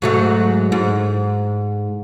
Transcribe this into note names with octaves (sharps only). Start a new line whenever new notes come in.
G#2 F#3 A3
G#2